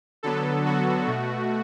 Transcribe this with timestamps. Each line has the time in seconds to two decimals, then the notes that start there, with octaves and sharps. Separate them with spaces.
0.23 D3 F#3 B3 A4
0.65 F#4
1.07 B2 A3